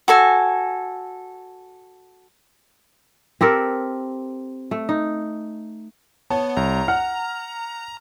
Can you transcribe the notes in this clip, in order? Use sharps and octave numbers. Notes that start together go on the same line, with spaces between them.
F#4 A4 G#5
C4 G4 A4 A#4
A3
D#4
B3 C#5 A5
C2 A#5
F#5 F6